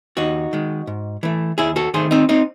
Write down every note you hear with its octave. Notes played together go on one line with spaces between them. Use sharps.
D#2 D#4 F#4
D#3 G#3
G#2
E3 A3
D#2 E4 G#4
F#4 A4
D#3 A3 G#4 C5
C4 D#4
C4 D#4